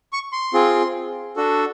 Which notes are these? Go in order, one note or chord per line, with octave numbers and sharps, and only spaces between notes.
C#6
C6
C4 F4 G#4
D4 F#4 A4